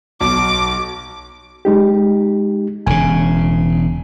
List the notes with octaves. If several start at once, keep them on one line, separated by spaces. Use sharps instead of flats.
B1 D6
G#3 D#4 G4
E1 C#3 G#5